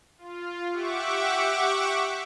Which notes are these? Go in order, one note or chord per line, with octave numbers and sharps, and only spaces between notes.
F4
G4 E5 F#5 C#6 D6